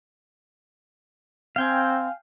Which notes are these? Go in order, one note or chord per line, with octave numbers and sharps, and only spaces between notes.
C4 F5 G5 G#5